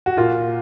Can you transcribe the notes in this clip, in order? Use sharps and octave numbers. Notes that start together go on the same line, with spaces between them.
F#4
A#2 F4